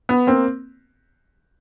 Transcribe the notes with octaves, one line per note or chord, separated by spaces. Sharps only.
B3
A#3 C4